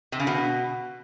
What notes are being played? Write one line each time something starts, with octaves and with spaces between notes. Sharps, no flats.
C3
C#3
B2